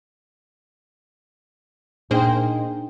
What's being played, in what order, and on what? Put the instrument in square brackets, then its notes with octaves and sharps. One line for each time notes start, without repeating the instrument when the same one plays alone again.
[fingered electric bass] A#2 [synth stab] A#3 G#4 C5 [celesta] D4 G5 [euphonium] D#4